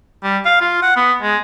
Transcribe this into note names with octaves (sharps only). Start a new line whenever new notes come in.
G3
F5
F4
F#5
B3
G#3